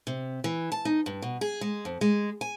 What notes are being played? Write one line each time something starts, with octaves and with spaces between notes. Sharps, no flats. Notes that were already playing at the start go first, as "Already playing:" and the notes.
C3
E3
A5
D#4
G2
B2
G#4
G#3
F2
G#3
G#5